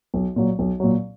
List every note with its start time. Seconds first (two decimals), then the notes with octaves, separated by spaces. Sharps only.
0.14 B1
0.36 A#2 F#3
0.59 B1
0.80 A#2 F#3